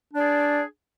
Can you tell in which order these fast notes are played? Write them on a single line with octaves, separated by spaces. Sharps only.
D4 D5 G#4